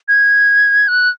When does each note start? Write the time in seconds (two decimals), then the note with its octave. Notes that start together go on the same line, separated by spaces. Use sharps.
0.08 G#6
0.88 F#6